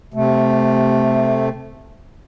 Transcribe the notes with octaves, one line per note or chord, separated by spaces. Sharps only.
C3 A3